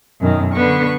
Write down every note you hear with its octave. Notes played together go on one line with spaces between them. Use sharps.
F#2 B2 D#3
D3 B3 B4 C#6